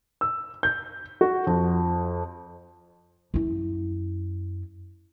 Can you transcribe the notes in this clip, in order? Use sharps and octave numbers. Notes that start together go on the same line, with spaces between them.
E6
G6
F#4
F2
F#2 E4